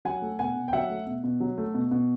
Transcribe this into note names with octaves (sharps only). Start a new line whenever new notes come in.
F#3 F#5 G#5
A3
B2 F#5 G#5
B2
G5
F#3 E5 F#5
A3
B2
B2
F#3
A3
B2
B2